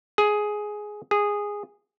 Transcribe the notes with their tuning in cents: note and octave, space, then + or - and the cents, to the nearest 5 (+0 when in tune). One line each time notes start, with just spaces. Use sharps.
G#4 +10
G#4 -10